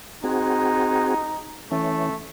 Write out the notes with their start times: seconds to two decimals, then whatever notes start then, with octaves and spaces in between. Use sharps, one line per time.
0.24 C4 D#4 F#4 G#4
1.72 E3 A3 C#4